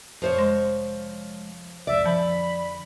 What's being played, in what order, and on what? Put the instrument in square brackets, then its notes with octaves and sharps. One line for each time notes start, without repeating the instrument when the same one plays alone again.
[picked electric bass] F1 F2 [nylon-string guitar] F3 C5 C#5
[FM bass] G#3
[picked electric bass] C2 F2 G#2 [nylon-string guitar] D5 [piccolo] E5
[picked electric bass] F2 D3 [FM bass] F3 [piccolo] B5